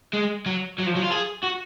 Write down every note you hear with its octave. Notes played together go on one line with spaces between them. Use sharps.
G#3
F#3
F#3
F3
F#3
F4
G#4
F#4